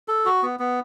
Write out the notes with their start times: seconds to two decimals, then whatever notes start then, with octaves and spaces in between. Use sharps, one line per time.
0.08 A4
0.25 F#4
0.43 B3
0.59 B3